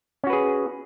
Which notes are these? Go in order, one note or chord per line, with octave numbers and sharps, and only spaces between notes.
C#4 F#4 G#4 B4